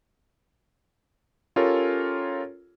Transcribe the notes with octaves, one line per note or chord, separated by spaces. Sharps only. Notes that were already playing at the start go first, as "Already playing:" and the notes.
C#4 F4 G4 A4 A#4 C#5